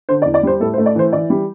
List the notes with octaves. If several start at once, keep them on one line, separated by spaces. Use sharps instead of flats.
D3 C5
D5
E2
D5
G3 C5
A2 A4
C5
A3
D5
E3 C5
E3 D5
G3